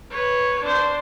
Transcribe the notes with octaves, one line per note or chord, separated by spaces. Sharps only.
B4 C#5
D4 C5